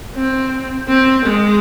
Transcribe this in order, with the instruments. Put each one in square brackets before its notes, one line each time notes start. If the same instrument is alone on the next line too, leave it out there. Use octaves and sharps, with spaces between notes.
[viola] C4
C4
G#3